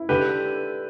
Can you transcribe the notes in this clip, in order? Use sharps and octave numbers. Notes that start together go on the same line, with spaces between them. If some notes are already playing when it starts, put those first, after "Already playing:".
Already playing: E4
D3 G4 B4